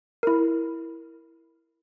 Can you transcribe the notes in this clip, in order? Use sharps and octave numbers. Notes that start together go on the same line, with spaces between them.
E4 A#4